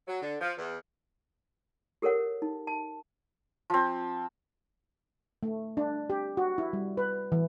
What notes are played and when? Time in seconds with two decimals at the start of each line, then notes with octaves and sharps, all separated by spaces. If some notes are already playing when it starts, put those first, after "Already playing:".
0.08 F#3
0.22 D3
0.41 F3
0.58 E2
2.02 G4 A4 A#4 C#5 F#5
2.42 D#4
2.67 A5
3.70 F3 C4
5.43 A3
5.77 D4
6.10 G4
6.37 F#4
6.58 E4
6.73 G3
6.97 B4
7.32 E3